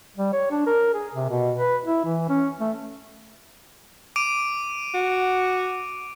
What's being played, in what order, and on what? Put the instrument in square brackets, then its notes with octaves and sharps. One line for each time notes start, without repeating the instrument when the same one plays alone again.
[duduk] G3
C#5
D4
A#4
G#4
C3
B2
B4
E4
E3
C#4
A3
[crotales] D6 D7 D#7
[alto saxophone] F#4